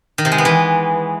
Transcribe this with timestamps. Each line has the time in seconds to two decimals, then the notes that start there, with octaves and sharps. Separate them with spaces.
0.18 D#3
0.25 C3
0.32 G#3
0.38 B3
0.45 E3